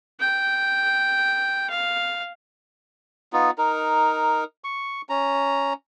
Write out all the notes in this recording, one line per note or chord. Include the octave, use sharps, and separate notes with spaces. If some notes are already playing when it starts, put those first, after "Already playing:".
G5
F5
B3 D#4 F4
D#4 A#4
C#6
C#4 A#5